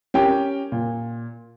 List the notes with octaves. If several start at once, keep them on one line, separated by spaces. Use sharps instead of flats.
C#4 G4 A#4 G5
A#2